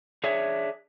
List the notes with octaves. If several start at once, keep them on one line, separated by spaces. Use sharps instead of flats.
D4 G#4 C#5 E5